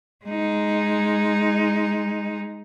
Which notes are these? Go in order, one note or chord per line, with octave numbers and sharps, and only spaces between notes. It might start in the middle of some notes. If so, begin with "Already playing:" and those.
G#3 D#4